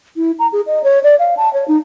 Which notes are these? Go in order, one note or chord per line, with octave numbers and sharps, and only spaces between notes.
E4
A#5
G#4
D#5
C#5
D5
F5
A5
C#5
D#4